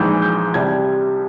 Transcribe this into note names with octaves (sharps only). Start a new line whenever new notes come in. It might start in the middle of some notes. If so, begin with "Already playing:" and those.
Already playing: A#1 G#2 E3 G6
G6
C2 C3 G3 G#6